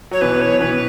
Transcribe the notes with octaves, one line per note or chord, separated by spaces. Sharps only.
F#3 C#5
B2 E3 B4
C#5
B2 E3 B4